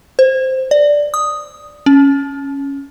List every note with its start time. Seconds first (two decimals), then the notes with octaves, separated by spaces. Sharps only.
0.19 C5
0.71 D5
1.14 D#6
1.86 C#4